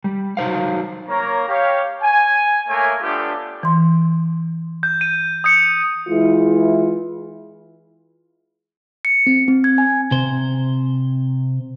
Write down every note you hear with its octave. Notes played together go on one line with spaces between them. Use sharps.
G3
F#3 D#4 C5 F5
A#3 C#5 A#5
G4 C#5 F5
G#5
A3 A#3 C#5 E5 G#5
A3 B3 D4 F4 G4 A4
E3 C6
G6
D#7
D#6 G6 C#7
E3 G#3 E4 F4
C#7
C4
C4
G#6
G#5
C3 C5